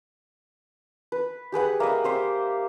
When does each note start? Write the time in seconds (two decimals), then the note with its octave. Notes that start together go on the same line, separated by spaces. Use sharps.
1.12 B4
1.52 G4 G#4 B4 F#5
1.80 A#3 D#5 E5
2.04 G4 C5 E5